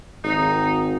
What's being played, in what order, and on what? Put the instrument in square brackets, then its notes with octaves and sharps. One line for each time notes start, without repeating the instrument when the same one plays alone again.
[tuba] G#1 [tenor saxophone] D#4